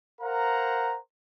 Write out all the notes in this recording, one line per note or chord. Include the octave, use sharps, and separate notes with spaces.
A#4 C5 F5 F#5 A#5